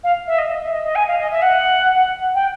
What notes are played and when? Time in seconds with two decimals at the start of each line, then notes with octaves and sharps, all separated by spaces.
0.04 F5
0.27 E5
0.38 D#5
0.50 D#5
0.61 E5
0.72 D#5
0.84 D#5
0.95 G#5
1.08 F5
1.19 D#5
1.31 E5
1.42 F#5
2.34 G5